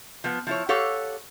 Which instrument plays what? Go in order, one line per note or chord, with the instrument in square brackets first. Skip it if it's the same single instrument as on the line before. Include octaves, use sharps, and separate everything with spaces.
[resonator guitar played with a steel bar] F3 B3
F3 E4 C#5
G4 A4 C#5 F5 F#5